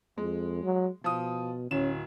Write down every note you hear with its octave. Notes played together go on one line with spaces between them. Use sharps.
F2 G#3
F#3
B2 F3 D#6
D1 C#4 E7